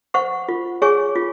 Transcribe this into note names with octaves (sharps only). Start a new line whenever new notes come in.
C5 F#5 C#6
F4
G#4 C#5 G#5 C#6
F4